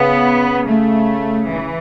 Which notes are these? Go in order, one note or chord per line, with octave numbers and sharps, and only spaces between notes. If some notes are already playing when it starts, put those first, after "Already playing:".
Already playing: C#3 B3
A3
E3